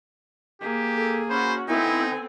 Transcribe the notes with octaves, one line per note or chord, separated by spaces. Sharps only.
A#3 G4 G#4
A4
C#4 F#4 C5 B5
B3 C4 D#4 E4 A4 G#5